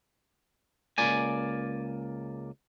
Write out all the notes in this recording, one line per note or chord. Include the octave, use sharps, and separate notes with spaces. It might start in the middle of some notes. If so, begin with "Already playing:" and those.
C#2 A#3 D5 G#5